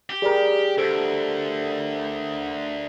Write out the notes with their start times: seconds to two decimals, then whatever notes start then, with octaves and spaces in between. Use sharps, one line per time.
0.10 G4
0.22 G3 G#4 A#4
0.78 D2 A4 C5 D7